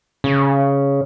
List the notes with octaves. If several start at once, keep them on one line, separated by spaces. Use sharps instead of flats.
C#3